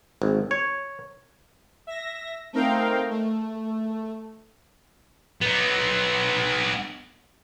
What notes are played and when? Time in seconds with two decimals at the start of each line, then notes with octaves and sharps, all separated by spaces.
0.22 G#1
0.51 C#5
1.87 E5 A#6
2.53 A3 C4 D#4 A#4 F5 G5
3.11 A3
5.41 B3 D#4